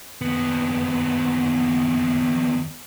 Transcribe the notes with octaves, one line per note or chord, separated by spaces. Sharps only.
D#2 B3